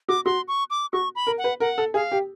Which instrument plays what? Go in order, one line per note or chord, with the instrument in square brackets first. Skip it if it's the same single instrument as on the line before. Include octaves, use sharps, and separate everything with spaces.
[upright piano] F#4 [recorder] D6
[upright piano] F#4 [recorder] C6
[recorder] C#6
D6
[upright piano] F#4 [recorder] C#6
[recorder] B5
[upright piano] A#4
[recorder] F#5
[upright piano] B4
[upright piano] A#4 [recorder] F#5
[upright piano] A4
[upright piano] G#4 [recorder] F5
[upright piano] G4